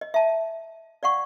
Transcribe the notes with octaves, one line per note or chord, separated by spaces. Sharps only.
D#5
E5 A5
D5 F5 F#5 C#6